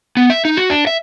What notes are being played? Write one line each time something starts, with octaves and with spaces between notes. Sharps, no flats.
B3
E5
D#4
F#4
D4
E5